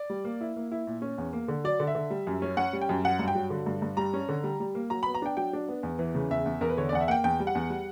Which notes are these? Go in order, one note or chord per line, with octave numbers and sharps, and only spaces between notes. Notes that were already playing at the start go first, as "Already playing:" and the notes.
Already playing: D5
G3
A#3
E4
A#3
E4
A#2
C#4
E2
A#3
D3
F#3 D5
D3
E5
D3
G3
F#2
C#4
C#4 F#5
G3
G5
F#2
F#3 F#5
G2
G5
F#3
D3
G2
G2
G3 A#5
C#4
D3
G3
G3
A#3
F#3 A#5
B5
B3
A#5
D4 G5
F#3 G5
D4
B3
E2
E3
C#3
E2 E5
E2
E2 A#4
B4
D3 C#5
D5
E2 F#5
E5
A#3 F#5 G5
E2 G5
G3
F#5
E2
G3